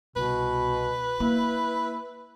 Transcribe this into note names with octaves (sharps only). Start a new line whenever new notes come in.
C2 B2 B4
A#3 E4